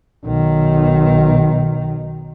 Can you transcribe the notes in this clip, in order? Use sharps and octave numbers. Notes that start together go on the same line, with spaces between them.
B1 D#3